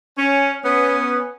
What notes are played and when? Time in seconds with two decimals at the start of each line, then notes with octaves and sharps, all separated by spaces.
0.18 C#4
0.64 B3 C#4